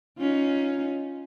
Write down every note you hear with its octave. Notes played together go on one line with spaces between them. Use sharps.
C#4 D#4 F4